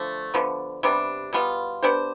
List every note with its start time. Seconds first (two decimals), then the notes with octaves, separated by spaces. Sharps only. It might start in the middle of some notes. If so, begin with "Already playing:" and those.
Already playing: D3 F3 A3
0.34 D3 F3 B3
0.83 C3 G3 B3 D4
1.33 B2 G3 B3 F4
1.83 B3 D4 G4 C5